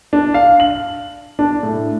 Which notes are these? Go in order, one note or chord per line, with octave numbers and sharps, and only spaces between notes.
D4
F5
F#7
D4
A2